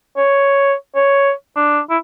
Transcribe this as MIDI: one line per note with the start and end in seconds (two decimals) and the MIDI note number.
0.17 0.74 73
0.95 1.32 73
1.56 1.80 62
1.90 1.98 64